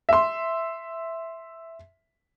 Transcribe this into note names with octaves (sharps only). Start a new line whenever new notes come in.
E5 C6